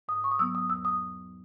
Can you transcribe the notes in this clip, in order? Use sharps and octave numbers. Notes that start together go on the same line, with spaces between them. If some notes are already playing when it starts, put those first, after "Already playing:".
G#2 D#6
C#6
D#6
F#3 B3 E6
D#6
E2 E6
D#6